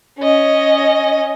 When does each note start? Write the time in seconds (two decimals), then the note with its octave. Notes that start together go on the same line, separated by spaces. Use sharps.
0.19 C#4 D#5